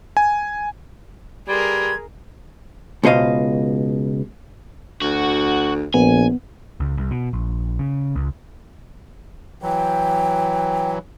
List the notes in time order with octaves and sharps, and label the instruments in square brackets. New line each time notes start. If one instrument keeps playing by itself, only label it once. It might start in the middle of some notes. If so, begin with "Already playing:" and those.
[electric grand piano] G#5
[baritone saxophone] G3 [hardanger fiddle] G#4 A#4 [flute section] B4 C6 G#6
[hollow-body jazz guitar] C#2 B2 C5 D#5 F5
[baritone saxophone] D2 [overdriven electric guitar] F#4
[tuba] A#1 [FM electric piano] B3 [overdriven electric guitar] G#5
[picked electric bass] C#2
C2
B2
A#1
C#3
C#2
[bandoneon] E3 F#3 [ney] G5